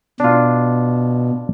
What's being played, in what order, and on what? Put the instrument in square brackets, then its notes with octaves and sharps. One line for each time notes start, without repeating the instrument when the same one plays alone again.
[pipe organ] B2 [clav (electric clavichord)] D4 F4